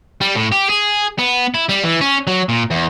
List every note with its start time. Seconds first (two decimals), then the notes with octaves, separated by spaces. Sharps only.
0.21 G3
0.36 A2
0.52 G4
0.70 G#4
1.19 B3
1.54 E4
1.69 G3
1.84 E3
2.01 C#4
2.27 F#3
2.49 A#2
2.71 E2